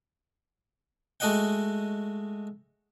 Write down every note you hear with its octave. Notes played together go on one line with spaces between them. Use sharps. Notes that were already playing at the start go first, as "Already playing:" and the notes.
G#3 A3 F#4 D#5 F#5 G5